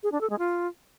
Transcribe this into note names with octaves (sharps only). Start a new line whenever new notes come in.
G#4
D4
A4
G#3
F4